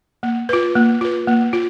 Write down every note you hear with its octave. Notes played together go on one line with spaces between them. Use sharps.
A#3
F4 B4
A#3
F4 B4
A#3
F4